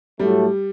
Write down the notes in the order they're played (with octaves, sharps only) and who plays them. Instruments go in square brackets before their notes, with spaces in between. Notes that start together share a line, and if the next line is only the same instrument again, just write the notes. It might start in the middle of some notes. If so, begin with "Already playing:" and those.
[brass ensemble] A2 F#3 A3 [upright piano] G3